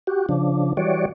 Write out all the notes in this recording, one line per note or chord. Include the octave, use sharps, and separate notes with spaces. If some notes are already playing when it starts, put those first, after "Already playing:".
F#4 G4
C#3 F3 D4
E3 G3 F#4 C#5 D5